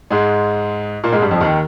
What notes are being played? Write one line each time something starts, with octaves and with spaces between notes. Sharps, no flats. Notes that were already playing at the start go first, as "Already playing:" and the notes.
G#2 G#3
A#2 A#3
G#2 G#3
G2 G3
F2 F3
D#2 D#3